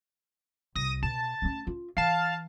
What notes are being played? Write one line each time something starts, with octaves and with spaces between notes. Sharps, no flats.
C2 D#6 A#6 D#7
B2 A5
A3 C#4
F4
E3 F5 A5